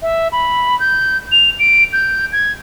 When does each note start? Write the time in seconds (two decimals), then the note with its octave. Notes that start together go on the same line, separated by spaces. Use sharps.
0.02 E5
0.32 B5
0.80 G6
1.32 F7
1.59 D7
1.93 G6
2.32 G#6